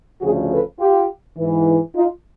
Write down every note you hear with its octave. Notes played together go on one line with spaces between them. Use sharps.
D2 C#3 F3 F#4 G#4
A4 B4
F4 G4
G#2 E3
D#4 F4